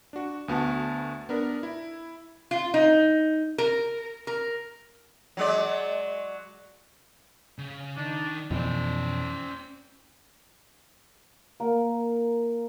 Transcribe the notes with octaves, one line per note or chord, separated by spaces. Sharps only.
D4 F#4
D2 B3 F#4 A5
B3 D4 A#4
E4
F4
D#4
A#4
A#4
F#3 G#3 D5
C#3
D#3 D4
F2 B2 E3 C4 C#4 D5
A#3